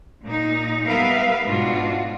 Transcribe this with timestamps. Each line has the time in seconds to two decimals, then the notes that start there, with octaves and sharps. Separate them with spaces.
0.24 A#2 D#4
0.86 G3 B3 A#4 B4 E5 F5
1.47 G#2 B2 D4 F4 F#4